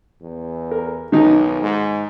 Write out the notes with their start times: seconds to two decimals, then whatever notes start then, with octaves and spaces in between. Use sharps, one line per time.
0.22 E2
0.71 A#4
1.12 B1 D#3 F#3 D#4
1.62 G#2